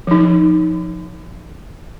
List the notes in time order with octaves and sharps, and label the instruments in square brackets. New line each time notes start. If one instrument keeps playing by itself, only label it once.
[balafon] F3 D#4